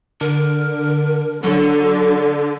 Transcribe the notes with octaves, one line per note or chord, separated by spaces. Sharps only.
D3 A#4
D3 F#3 A4